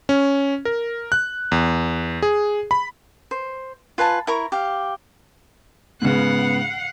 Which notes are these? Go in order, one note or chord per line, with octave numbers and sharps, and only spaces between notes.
C#4
A#4
F#6
E2
G#4
B5
C5
F4 B4 G#5 A5
E4 A#4 A#5 C#6
G4 F5
G#2 C#3 B3 F5 F#5